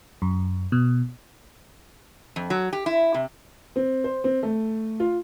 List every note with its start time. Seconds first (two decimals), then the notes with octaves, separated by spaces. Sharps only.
0.22 F#2
0.72 B2
2.36 F2
2.50 F#3
2.73 G4
2.86 E4
3.14 C3
3.76 C4
4.04 C5
4.24 C4
4.43 A3
5.00 F4